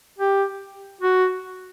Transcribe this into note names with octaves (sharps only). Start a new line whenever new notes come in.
G4
F#4